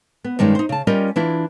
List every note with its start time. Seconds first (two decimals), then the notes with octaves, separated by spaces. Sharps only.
0.24 B3
0.39 G2 D#3 G#3 C#4
0.55 D#4 C5
0.69 C#3 A5
0.87 G3 C#4 F4 G4 A#4 D#5
1.16 E3 D4 E4 F4